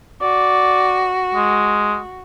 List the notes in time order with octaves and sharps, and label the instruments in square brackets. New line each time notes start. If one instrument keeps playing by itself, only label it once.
[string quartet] F#4 [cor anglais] D5
[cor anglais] G#3